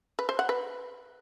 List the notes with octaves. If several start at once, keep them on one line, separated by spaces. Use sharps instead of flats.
B4
C5
F#5
B4